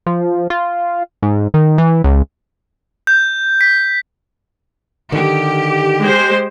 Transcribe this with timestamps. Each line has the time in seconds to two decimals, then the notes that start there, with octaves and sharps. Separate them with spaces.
0.06 F3
0.50 F4
1.23 G#2
1.54 D#3
1.78 E3
2.04 C#2
3.07 G6
3.61 B6
5.12 D3 D#3 G4
6.03 G#3 C5